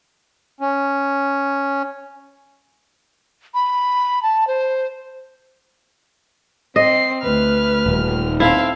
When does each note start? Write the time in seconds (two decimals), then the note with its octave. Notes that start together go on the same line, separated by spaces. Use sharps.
0.61 C#4
3.54 B5
4.23 A5
4.47 C5
6.76 C4 D#5 C7
7.23 D2 B4 F6
7.86 D#1
8.40 C4 E4 A4 F5